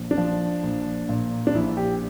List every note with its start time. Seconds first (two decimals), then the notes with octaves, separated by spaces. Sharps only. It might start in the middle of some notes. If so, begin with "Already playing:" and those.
Already playing: A#1
0.11 D4
0.17 F3
0.63 A#1
1.09 A#2
1.47 D4
1.54 A#1 E4
1.77 G4